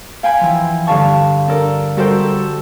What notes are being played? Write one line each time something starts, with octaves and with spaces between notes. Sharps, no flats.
F5 G5 G#5 B5
E3 F3
G2 D3 F5 A5 C#6
D4 A4 A#4 D5
G3 F#4 A4 A#4 C5 G5
A4